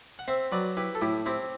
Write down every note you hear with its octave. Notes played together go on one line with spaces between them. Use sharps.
F#5
C4 C5 E5
F#3 B4 D5
E4 G4 B4
A4
A2 E4 G4
C4 E4 G4